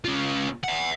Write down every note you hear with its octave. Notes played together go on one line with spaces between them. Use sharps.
C#3 F4
E5 F#5